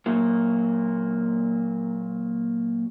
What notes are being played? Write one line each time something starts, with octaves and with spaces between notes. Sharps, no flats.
A#2 F#3 A#3